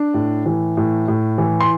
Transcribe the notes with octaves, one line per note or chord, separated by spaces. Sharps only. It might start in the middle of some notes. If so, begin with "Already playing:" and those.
Already playing: D4
A2
E3
A2
A2
E3
C6